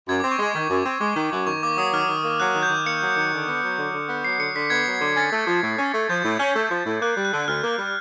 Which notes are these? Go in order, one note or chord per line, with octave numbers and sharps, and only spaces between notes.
F#2 G#6
C4 D6
C#6
G#3 D6
D#3
F#2
C4
G#3 D6
D#3
F#2
D#3 C#6
A#3 D6
F#3 D#6
D#3 F6
D#3
A#3
F#3 F#6
D#3
G6
D#3
A#3 C#7
F#3
D#3
D3
B3
F#3
D3
D3
B3
F#3 C7
D3 C#7
D3 B6
B3 G#6
F#3
D3
C#4 A6
A3
F3
A2
C#4
A3
F3 G6
A2
C#4
A3
F3
A2
A#3 F#6
G3
F#6
D3
D2 F6
A#3
G3